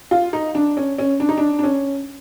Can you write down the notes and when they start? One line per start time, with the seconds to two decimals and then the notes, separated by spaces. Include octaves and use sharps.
0.11 F4
0.33 D#4
0.55 D4
0.77 C#4
0.99 C#4
1.20 D4
1.29 D#4
1.37 D4
1.59 D4
1.64 C#4